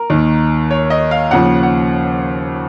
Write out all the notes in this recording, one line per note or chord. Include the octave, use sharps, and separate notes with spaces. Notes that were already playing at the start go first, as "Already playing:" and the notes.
Already playing: A#4
D#2 D#3
C#5
D#5
F5
D#2 C#3 F3 F#5
F#5